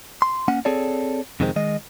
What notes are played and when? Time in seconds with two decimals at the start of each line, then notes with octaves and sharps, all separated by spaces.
0.22 C6
0.48 A#3 C#4 F#5
0.65 C4 G#4 A4 C#5 D5
1.40 F2 C3 D#3 G#3 C4
1.56 D#3 G#3 D#5